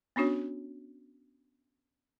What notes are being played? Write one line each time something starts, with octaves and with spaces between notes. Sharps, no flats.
B3 C#4 D4 F#4 C#5